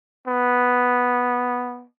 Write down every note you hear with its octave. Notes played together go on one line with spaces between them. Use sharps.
B3